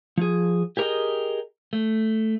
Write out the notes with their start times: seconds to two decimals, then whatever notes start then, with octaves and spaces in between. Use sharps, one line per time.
0.17 F3 G#4
0.77 G4 G#4 A#4 C#5 D#5 G5
1.73 A3